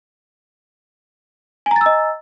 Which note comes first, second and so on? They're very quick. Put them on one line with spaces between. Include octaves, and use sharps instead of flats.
G#5 A#5 A6 E6 D#5